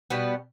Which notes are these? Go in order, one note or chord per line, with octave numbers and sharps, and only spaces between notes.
B2 G3 B3